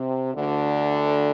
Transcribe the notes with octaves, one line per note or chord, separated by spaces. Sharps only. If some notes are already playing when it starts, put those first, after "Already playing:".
Already playing: C3
D2 D3